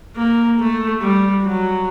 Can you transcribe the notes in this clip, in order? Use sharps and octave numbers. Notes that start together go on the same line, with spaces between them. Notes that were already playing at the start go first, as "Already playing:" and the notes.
A#3
A3
G3
F#3